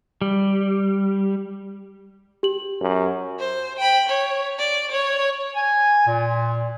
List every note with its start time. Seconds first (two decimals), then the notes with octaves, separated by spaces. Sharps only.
0.22 G3
2.43 G4 F#7
2.81 F#2
3.39 C5
3.79 G5 B5
4.08 C#5
4.58 D5
4.91 C#5
5.55 G#5
6.07 A#2